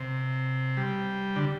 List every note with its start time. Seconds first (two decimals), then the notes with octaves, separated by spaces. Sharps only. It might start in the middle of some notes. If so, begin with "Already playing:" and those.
Already playing: C3
0.77 G3
1.36 D3